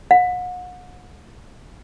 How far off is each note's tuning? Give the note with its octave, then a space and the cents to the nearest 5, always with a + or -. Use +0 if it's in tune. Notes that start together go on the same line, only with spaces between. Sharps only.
F#5 -35